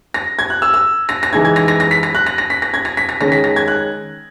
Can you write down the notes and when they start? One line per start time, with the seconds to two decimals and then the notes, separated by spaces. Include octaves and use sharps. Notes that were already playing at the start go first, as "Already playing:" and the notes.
0.14 A#6
0.39 G#6
0.50 F#6
0.62 E6
0.74 E6
1.09 A#6
1.23 A#6
1.33 E3 G#3 D#4 G#6
1.45 G#6
1.56 A#6
1.68 A#6
1.80 A#6
1.91 B6
2.03 A#6
2.15 F#6
2.26 A#6
2.38 A#6
2.50 B6
2.62 A#6
2.74 G#6
2.85 A#6
2.97 B6
3.09 A#6
3.20 D#3 G#3 C#4 A#6
3.32 B6
3.44 A#6
3.56 G#6
3.68 F#6